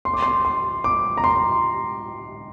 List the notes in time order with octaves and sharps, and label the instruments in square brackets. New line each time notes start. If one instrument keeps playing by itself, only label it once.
[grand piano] C6
D6
C6
C6
D6
A#5
C6